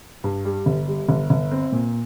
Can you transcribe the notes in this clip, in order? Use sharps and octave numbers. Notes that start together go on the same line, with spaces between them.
G2
G3
G1
G3
G1
G1
C4
A#2